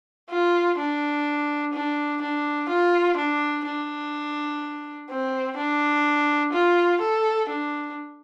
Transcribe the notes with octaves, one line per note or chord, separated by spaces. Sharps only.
F4
D4
D4
D4
F4
D4
D4
C4
D4
F4
A4
D4